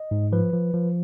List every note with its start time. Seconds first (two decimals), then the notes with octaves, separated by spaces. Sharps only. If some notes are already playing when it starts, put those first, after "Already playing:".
Already playing: D#5
0.11 G#2
0.32 F3 B4
0.53 F3
0.74 F3